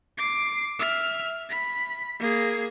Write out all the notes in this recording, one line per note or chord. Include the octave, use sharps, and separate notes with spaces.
D6 C7
E5 F6
B5
A#3 G#4